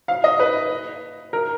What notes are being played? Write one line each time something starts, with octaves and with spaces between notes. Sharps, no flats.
F5
D#5
B4
A#4